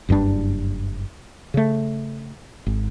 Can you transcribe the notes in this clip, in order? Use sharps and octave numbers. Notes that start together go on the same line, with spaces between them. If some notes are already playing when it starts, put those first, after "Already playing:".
F#1 G2 G3 D4
C#3 A3
G#1